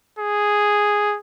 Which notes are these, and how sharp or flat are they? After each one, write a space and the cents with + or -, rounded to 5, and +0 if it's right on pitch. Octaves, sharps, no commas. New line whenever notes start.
G#4 -5